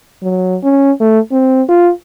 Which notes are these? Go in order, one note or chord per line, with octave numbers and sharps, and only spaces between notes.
F#3
C#4
A3
C4
F4